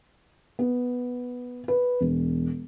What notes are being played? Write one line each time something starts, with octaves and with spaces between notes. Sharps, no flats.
B3
B4
E1